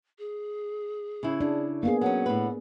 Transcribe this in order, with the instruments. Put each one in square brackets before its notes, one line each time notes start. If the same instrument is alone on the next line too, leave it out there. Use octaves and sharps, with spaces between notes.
[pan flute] G#4
[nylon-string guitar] C#3 E4
[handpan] D4 [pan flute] G#4
[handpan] A#3 B3 G#4 [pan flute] F5
[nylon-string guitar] F#3 C#4 [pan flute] F#5
[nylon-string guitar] A2 B4